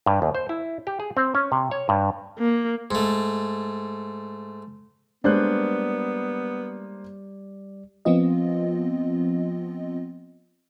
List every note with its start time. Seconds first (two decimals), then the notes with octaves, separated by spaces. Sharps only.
0.06 G2
0.22 D#2
0.35 C5
0.49 E4
0.87 G4
1.00 G#4
1.17 C4
1.35 C#4
1.52 C3
1.71 C#5
1.89 G2
2.39 A#3
2.91 G#2 A3
5.24 G3 G#3 A#3 B3 D4 C5 D5 F#6
8.05 F3 B3 C4 F4 D#5